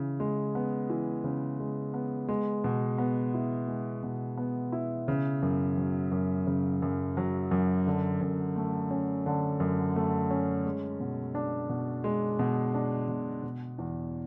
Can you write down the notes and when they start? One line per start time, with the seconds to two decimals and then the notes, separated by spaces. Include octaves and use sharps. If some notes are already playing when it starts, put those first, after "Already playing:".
Already playing: C#3 E3
0.20 G#3
0.55 B3
0.90 E3
1.24 C#3
1.60 G#3
1.94 B3
2.28 G#3
2.64 B2
2.98 B3
3.34 E4
3.68 G#3
4.03 B2
4.37 B3
4.72 E4
5.08 C#3
5.42 F#2
5.77 F#3
6.12 F#2
6.47 C#3
6.82 F#2
7.17 F#3
7.51 F#2
7.87 D3
8.21 F#2
8.56 A3
8.91 C#4
9.26 D3
9.60 F#2
9.96 A3
10.31 C#4
10.65 G#3
11.00 B2
11.35 D4
11.69 B2
12.04 G#3
12.39 B2
12.74 D4
13.08 B2
13.43 B2
13.78 E2